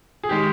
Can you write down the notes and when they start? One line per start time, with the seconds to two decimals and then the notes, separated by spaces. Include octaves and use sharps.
0.24 G#4
0.29 D#3 G#3 G4